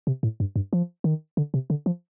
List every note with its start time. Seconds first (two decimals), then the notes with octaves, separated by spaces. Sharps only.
0.07 C3
0.23 A2
0.40 G2
0.56 G2
0.73 F3
1.04 D#3
1.37 D3
1.54 C3
1.70 D3
1.86 F3